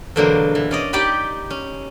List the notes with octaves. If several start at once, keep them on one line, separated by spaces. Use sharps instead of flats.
E2 B2 D3 F#3 A#3 C5
E3
C#4 D5 D#5
D#4 G4 D5 G5 B5
C#4